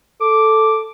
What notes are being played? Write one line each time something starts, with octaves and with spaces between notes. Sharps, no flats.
A4 D6